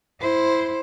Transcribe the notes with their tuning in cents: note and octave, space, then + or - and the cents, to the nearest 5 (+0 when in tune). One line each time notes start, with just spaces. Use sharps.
E4 +0 C5 +0